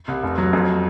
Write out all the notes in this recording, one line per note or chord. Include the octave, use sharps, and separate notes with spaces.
C2
F1
F#3
F2